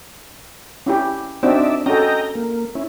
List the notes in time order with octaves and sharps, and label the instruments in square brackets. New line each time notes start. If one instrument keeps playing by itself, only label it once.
[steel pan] C#4 E4 G4
[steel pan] C4 D4 F#4 [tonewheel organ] D#4 D5 E5
[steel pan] C#4 F#4 A4 [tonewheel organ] D#5 G5 A#5
[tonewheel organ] A#3
C#4 E4